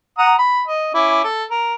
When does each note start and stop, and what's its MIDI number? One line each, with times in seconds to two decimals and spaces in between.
0.18 0.35 78
0.18 0.35 82
0.18 0.35 87
0.38 0.63 83
0.67 0.93 75
0.94 1.23 61
0.94 1.23 64
0.94 1.23 86
1.24 1.44 69
1.51 1.74 70